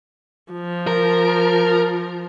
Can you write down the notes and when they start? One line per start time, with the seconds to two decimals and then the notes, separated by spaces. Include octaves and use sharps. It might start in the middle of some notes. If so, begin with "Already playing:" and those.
0.53 F3
0.87 A#4